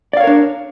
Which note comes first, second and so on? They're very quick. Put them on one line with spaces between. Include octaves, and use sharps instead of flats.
D5 F5 C#5 A#4 D4